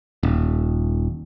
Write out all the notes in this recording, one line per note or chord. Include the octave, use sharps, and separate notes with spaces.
D#1